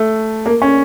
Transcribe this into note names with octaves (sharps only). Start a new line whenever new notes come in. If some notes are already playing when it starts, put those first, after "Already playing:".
Already playing: A3
A#3
C#4